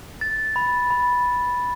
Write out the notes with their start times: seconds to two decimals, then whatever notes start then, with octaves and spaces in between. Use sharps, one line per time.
0.21 A6
0.56 B5
0.91 B5